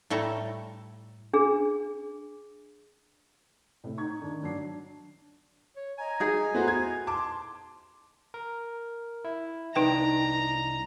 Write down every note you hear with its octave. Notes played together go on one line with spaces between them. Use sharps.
A2 G3 A3 C#5 A5 A#5
D4 G#4
A2 C3
D#4 C#6 G#6
D#3 D4
G1 F#3 D4 C7
C#5
D#5 G#5 A#5
D#4 G#4
A3 B3 F#4 C5 A#5
G#6
A5 C6 D6
A#4
E4
C2 D4 D#4 B4 D#5 G5 A#5